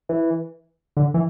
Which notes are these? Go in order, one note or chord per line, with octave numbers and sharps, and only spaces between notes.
E3
D3
E3